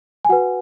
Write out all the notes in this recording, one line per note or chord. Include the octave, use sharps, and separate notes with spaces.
G#5
F#4 B4 F#5